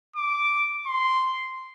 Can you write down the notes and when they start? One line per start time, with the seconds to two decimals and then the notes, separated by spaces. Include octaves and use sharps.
0.16 D6
0.87 C6